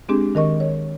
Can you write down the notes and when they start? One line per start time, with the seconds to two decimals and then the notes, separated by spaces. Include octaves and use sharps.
0.09 G#3 C4 D4 G4 G#4
0.35 D#3 A#4 D#5 C#6
0.60 C#5